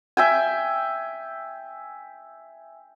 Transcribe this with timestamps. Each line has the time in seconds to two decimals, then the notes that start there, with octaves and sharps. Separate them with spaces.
0.17 E5 G5 G#5